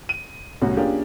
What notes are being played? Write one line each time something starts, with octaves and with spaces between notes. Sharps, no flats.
D#7
C2 A2 C#4 F#4
A#3 C#4 D4 F4 G4 G#4